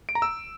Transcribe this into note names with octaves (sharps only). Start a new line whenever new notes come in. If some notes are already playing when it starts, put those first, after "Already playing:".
D7
A#5
E6